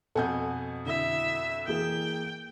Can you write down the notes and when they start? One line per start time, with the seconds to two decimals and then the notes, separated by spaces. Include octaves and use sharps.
0.16 F2 B2 A4 F#5 G#5 G6
0.86 D3 E4 E5
1.67 E3 A#3 G#4 G5